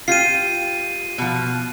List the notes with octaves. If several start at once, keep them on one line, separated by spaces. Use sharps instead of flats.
F4 G4 C7 D#7
B2 F3